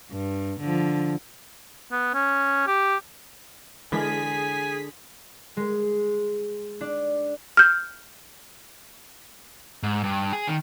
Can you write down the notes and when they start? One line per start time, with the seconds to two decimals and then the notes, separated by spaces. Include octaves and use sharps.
0.12 G2
0.61 D3 F3
1.91 B3
2.14 C#4
2.67 G4
3.92 D3 E3 G#3 G#4 A#4 G#5 B6
5.57 G#3
6.81 D4
7.57 F6 G6
9.83 G#2
10.04 G2
10.33 G#4
10.48 D#3